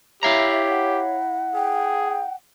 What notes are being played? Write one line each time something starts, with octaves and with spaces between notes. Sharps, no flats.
E4 G4 C#5 E5 F5 A#5
F#5
G#4 G5